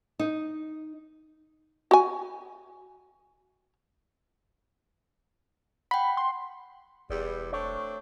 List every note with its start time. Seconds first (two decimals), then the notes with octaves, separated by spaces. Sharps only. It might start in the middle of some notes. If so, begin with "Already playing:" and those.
0.19 D#4
1.91 F#4 G#5
5.91 F#5 G5 B5
6.17 C6
7.10 E1 E2 G3
7.52 A3 C4 D4 C#5